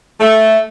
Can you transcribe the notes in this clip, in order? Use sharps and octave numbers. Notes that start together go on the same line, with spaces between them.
A3